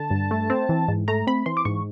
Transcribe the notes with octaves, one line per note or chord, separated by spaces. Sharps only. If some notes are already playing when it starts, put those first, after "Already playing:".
Already playing: D3 A5
G2
A3
C4
E3
G#2
A3 A#5
C4 B5
E3 C6
D6
G#2 C#6